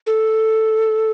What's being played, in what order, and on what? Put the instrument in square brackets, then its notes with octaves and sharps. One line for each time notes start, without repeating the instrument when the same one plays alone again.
[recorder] A4